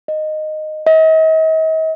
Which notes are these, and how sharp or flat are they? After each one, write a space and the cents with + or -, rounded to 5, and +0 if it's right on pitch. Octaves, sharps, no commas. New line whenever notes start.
D#5 -10
D#5 +40